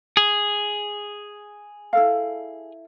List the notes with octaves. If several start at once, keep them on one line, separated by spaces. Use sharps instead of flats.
G#4
E4 A4 F5